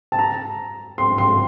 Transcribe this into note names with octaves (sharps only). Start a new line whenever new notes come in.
A5
A#5
C6
C6